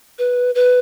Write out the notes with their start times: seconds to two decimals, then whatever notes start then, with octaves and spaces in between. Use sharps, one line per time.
0.19 B4
0.55 B4